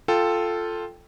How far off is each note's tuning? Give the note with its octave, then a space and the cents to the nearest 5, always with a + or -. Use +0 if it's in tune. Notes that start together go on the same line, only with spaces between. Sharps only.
F4 +0 A4 +0 G5 +0